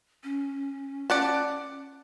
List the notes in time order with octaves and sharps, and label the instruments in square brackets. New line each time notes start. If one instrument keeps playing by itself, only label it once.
[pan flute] C#4
[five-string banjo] D5 F#5 A5